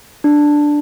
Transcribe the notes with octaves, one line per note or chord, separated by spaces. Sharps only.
D4